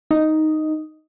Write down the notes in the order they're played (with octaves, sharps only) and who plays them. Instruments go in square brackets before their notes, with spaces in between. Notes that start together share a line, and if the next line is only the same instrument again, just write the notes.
[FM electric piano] D#4